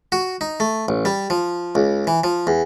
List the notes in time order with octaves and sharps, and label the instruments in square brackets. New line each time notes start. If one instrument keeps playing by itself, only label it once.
[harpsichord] F#4
D#4
A3
A1
G3
F3
C#2
E3
F3
E2